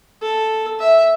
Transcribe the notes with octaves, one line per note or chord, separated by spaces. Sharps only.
A4
E5